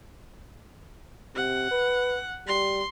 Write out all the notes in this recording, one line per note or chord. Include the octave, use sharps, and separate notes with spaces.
C3 F#5
B4
G3 C6